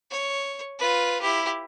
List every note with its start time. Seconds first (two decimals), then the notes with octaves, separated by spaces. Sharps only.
0.11 C#5
0.79 F4 B4
1.21 E4 G4